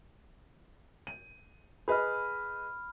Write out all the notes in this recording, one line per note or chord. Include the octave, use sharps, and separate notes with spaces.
D#7
G#4 B4 D#5 B5 F6